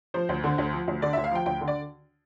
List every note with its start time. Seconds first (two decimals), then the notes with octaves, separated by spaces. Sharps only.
0.14 F3 C5
0.29 D2
0.44 D3
0.58 D2
0.73 F3
0.88 D2
1.02 D3 D5
1.13 D2 E5
1.24 F5
1.31 F3 G5
1.46 D2 G5
1.61 D3
1.68 D5